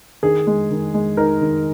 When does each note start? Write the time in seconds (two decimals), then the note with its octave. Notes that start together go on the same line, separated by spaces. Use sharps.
0.23 D#3 G#4
0.47 G#3
0.71 D#3
0.94 G#3
1.17 D#4 A#4
1.41 D#3